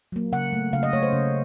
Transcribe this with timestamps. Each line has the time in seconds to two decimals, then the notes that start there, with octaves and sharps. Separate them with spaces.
0.12 F#3 A#3
0.32 C#3 F#5
0.53 A3
0.73 C#3 F5
0.83 D#5
0.93 A3 C#5
1.03 C5
1.13 C#3